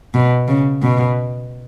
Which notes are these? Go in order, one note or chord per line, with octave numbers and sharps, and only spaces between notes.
B2
C#3
B2